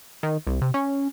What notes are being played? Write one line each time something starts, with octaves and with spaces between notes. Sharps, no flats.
D#3
C2
C3
C#4